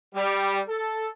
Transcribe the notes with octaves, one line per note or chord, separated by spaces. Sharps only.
G3
A4